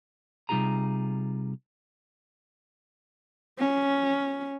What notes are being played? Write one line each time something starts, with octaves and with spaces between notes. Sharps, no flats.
C3 G3 D#4 F4 G#4 A#5
C#4